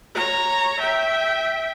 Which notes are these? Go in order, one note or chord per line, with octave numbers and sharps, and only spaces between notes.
C#5 A#5
E5 G5